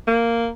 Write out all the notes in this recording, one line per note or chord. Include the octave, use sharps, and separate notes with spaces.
A#3